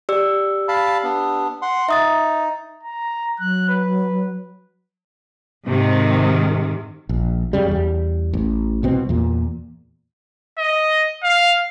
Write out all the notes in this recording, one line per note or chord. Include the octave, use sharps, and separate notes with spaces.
G4 D5 E6
F5 A5 B5
B3 D4
F#5 C6
D#4 E5 D#6 A6
A#5
F#3 F#6
B4
G#2 C3 D#3
A#1
F#2 C#3 G3
E2 G3
A1
C2 B2 C4
E2 A#2
D#5
F5